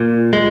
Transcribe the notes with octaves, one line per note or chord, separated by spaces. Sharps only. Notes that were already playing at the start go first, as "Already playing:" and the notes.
Already playing: A#2
G#3